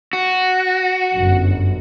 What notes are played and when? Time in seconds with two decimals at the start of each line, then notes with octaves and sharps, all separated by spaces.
0.13 F#4
1.15 G1 F#2